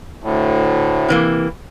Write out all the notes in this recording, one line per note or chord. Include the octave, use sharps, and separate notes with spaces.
D2 A2
C3 E3 A#3